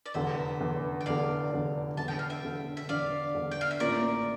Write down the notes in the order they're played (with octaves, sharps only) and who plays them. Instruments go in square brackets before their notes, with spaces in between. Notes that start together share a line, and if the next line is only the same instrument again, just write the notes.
[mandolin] D5
[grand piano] F1 E2 D3 [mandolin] C5 E5
[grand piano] F1 E2 D3
[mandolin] G5
[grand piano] F1 E2 D3 [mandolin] D5 F5
[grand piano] F1 E2 D3
[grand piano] E1 E2 D3 [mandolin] A5
[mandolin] G5
F5
E5 G5
[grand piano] E1 E2 D3
[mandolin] E5
[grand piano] E1 E2 D3 [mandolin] D5 F5
[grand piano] E1 E2 D3
[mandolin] G5
F5
E5
[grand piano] A1 A2 E3 A#3 F4 [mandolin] A#4 D5